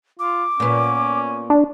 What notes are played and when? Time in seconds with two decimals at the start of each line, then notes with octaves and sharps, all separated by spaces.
0.19 F4 D6
0.60 A#2 B3 C#4
1.50 D4